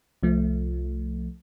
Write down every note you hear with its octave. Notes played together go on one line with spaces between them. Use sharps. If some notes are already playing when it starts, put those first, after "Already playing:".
C2 F3 A3